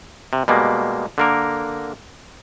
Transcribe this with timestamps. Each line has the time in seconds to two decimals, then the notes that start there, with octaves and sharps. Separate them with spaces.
0.33 C3
0.48 B2 G3 G#3 A#3
1.18 D3 A#3 A#4